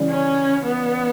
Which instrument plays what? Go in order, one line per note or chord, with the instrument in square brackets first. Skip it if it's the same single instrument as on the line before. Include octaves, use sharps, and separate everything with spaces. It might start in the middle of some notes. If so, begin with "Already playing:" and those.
Already playing: [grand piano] C#3 E3 G3
[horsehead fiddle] C#4
B3